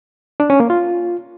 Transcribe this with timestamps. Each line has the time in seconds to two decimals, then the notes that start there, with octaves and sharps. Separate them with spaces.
0.40 D4
0.50 C#4
0.60 A#3
0.70 F4